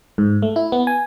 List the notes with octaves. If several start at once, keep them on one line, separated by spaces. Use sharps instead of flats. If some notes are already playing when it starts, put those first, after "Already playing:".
G#2
A3
E4
B3
G#5